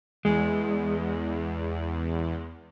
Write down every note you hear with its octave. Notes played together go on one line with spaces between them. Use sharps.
E2 G#3